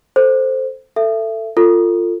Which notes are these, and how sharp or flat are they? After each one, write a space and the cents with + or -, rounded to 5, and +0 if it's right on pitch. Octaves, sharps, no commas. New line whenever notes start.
A4 +0 C5 +0
A4 +15 E5 +25
F4 +0 A4 +30